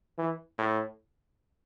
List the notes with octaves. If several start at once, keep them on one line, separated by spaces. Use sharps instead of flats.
E3
A2